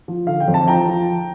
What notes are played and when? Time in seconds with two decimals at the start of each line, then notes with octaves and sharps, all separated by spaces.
0.08 F3
0.27 D3 F5
0.40 G5
0.48 F2
0.54 A5
0.68 F3 G5 A#5
0.87 F3